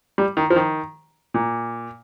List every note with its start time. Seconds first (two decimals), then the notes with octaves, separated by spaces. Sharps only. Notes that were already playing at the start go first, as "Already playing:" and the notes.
0.18 G3
0.37 D#3
0.50 F3
0.56 D#3
1.34 A#2